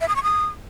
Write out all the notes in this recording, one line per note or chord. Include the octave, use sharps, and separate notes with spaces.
E5
D#6
C#6
D#6